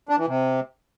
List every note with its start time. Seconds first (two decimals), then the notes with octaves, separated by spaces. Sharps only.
0.09 D4
0.18 E3
0.27 C3